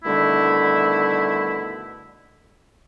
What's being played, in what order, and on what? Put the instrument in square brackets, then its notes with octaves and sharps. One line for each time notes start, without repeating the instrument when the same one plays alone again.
[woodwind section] B2 D3 D#3 G3 A3 E4